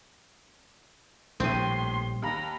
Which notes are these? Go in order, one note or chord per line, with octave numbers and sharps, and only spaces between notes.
A#1 A2 G3 C4 C6 D#7
D#2 A#5 B5